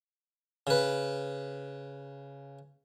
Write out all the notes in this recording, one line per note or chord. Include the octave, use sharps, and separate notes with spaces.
C#3 B4